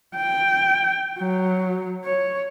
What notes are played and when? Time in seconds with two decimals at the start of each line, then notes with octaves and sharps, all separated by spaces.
0.15 G5
1.19 F#3
2.04 C#5